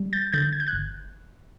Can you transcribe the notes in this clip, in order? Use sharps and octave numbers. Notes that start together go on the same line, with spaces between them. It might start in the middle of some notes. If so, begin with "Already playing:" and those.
Already playing: G3
G6 A6
D3 G6 A6
G#6
G6
F#6 G#6
G1